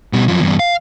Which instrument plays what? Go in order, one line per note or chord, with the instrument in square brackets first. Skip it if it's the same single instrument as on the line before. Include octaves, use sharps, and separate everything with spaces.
[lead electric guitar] B2 G3
F#2 F3
E2 G2
F5